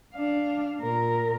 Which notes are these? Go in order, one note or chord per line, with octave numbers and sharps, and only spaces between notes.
D4 F5
A#2 A#4